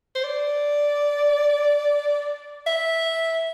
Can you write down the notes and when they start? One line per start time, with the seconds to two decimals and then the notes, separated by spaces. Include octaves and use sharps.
0.15 C5
0.24 D5
2.67 E5